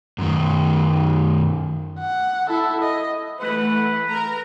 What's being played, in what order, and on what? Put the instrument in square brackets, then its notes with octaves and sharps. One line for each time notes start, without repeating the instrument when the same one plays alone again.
[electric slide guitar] F#2 D#3
[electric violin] F#5
E4 A4
D#5
[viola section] E3 A3 F#5 [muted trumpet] B4
[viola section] A#4 A#5